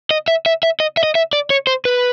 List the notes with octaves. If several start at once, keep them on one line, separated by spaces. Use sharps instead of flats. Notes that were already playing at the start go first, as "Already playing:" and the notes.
D#5
E5
E5
E5
D#5
E5
D#5
E5
D5
C#5
C5
B4